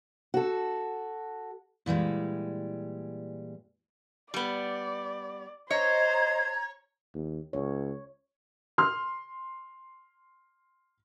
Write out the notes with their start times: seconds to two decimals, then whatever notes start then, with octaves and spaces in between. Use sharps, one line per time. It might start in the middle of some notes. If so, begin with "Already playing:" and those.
0.34 F#4 A4
1.86 A#2 E3 G3 G#3
4.34 G3 B3 D5
5.70 C5 C#5 D#5 A#5 G#6
7.14 D#2
7.53 C#2 C#5
8.78 C6 F6